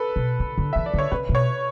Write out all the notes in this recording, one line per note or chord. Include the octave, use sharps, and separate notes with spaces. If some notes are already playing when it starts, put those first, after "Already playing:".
Already playing: A4 B4
B2
D3
D3
E3 E5
D5
D3 C#5
C#3 B4
B2
C#5